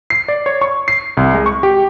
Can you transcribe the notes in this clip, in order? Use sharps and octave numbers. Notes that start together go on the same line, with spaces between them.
C7
D5
C#5
C#6
C7
C2
G#3
C#6
G4